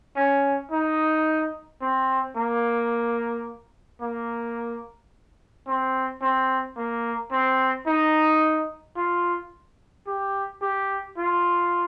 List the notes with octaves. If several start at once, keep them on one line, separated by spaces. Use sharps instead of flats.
C#4
D#4
C4
A#3
A#3
C4
C4
A#3
C4
D#4
F4
G4
G4
F4